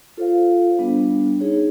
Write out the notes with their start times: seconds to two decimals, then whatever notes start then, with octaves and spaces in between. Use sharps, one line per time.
0.17 F4 A4 C5 F5
0.79 G3 B3 D4
1.40 D#4 G#4 C#5